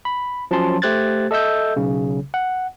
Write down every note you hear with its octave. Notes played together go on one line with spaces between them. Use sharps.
B5
F3 F#3 C#4 A5 C6
A3 G4 C5 F#6 G#6 A6
A4 D#5 E5 E6 G6
B1 C#3
F#5